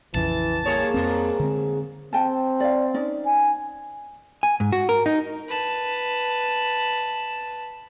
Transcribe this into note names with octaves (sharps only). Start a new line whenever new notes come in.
A#1 F2 C#3 E3 A5
G3 A#3 G#4 C#5
F2 G#2 G3 C4
D3 G#3 C4
C4 G5 A5
D5 F5
C#4 D#4 D5
G#5
G#5
G#2
F#4
A#4
D#4
B4 A5